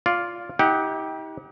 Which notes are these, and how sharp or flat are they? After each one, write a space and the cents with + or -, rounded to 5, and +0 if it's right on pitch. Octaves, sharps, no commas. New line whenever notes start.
F4 +0 D5 -15
D#4 +40 G4 +0 F#5 +0